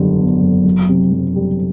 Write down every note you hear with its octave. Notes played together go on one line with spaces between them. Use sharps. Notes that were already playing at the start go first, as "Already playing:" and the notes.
Already playing: F#1 E2 D3 G3
E2
F#1
F#1
C3
F#1
G3